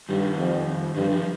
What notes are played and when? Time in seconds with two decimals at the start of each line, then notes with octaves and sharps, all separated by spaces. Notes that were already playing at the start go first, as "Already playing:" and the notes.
0.09 G2 D#3 G3
0.38 F2
0.96 G2 D3 F3
1.10 D3 F3